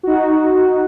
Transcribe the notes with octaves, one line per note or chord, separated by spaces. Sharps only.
D#4 F#4